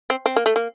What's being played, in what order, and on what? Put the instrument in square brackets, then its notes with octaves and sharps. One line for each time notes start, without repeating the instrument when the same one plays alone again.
[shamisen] C4
C4
A#3
A3
A#3